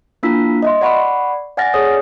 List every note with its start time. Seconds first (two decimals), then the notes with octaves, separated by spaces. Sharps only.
0.23 A#3 D4 E4 F4 E6 B6
0.63 D#5 E5 C6
0.82 D5 F#5 B5 C#6
1.57 D5 F#5 G#5 F6 A6 A#6
1.74 G#4 A4 C#5 D#6